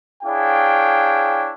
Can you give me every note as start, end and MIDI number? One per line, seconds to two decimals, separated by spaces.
0.24 1.54 62
0.24 1.54 64
0.24 1.54 68
0.24 1.54 73
0.24 1.54 77
0.24 1.54 79